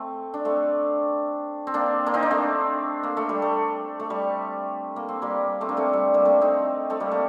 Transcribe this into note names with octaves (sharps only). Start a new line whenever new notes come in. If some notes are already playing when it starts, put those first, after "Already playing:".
Already playing: A3 C4
D4
A3 C4
C4
A#3 D4
A#3 D4
C4 D#4
A#3 D4
A3 C4
A#3
A3
G3
A3
A3
G3
A#3
C4
G3 A#3
A3 C4
A#3 D4
A3 C4
G3
G3 A#3
A3 C4
C4 D#4
A3 C4
G3 A#3
A3